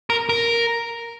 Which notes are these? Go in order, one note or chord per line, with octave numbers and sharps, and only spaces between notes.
A#4
A#4